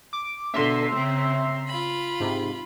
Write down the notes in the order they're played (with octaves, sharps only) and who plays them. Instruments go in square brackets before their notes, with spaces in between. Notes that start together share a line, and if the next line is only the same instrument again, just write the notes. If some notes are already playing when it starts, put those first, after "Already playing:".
[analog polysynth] D6
[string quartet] B2 D3 [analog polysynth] E5 A#5 C6
[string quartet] C#3 C4
F4 B5
[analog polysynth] G#2 C3